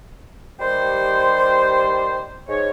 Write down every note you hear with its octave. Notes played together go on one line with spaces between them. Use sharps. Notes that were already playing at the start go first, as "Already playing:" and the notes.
D#3 G3 G4 C5
G#2 C#5